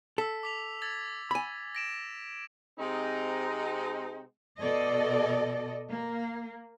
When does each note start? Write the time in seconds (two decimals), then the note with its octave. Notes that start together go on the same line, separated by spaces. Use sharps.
0.18 A4 E6 B6
0.43 D6 B6 F7
0.82 E6 G#6 A6
1.31 G#5 B5
1.75 A#6 D7 E7
2.77 C3 G#3 C4 D#4
4.59 B2 A4 D5 D#5
5.91 A#3